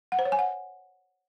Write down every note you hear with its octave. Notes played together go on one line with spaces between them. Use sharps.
F#5
C5
C#5
G#5
F#5